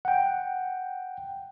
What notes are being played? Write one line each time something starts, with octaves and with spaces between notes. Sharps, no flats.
F#5 G5